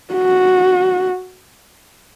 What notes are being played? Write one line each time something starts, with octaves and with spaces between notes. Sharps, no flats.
F#4